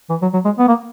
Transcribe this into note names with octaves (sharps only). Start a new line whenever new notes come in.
E3
F#3
F#3
G#3
B3
A#3